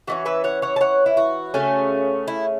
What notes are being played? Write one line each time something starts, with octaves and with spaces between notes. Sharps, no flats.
E3 A3 C#4 F#4
B4 E5
C#5 F#5
C#5 F#5
A5
C#5 F#5
E4
F#4
C#3 A3 C#4
E4